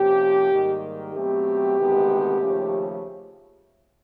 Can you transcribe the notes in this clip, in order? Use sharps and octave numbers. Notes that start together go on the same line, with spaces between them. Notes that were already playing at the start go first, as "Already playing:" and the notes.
Already playing: C3 F3 A#3 C#4 G4
G#2 D#3 G3 A#3
B2 F#3 A3 C4 G4
D2 C3 D#3 G#3 B3
D#2 C#3 F3 A3 C#4